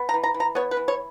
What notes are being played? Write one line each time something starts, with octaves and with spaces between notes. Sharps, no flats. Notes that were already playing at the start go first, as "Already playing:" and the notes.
Already playing: B3
A#5
E3
A#5
E3
A#5
B3 C#5
B4
E3
C#5